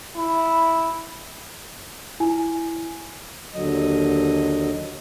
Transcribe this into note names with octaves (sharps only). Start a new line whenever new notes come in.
E4
E4 G#5
D#2 D3 F#3 D#5